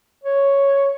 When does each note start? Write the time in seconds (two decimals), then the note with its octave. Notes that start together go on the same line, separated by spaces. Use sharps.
0.24 C#5